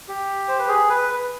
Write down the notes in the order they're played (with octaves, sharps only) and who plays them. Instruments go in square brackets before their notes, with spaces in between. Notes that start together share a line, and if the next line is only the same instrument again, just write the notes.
[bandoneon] G4
C5
B4
G#4
B4